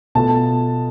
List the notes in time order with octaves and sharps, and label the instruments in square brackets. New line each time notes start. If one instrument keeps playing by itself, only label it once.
[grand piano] B2 A3 F4 [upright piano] A5